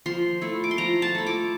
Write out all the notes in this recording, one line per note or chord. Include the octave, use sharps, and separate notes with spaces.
F3 C6
A3 E4
D6
C6
F3 A#5
A5
A3 E4
D6